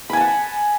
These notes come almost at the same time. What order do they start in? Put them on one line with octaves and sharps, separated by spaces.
B5 G#5 A5 F#5